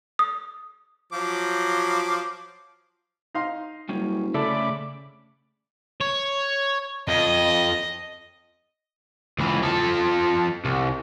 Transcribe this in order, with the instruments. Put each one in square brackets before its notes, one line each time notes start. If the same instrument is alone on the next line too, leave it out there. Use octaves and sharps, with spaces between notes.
[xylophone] D#6
[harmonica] F3 F#3 D6
[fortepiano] D#4 F5 C6
[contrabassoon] F#1 [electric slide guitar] G3 C#4
[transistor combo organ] C#3 B5 D6 [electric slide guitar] A3 D5 E5 [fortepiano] A4
[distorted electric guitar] C#5
[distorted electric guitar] F2 [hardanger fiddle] D#5
[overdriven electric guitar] C#2 E3
F3 A4
C2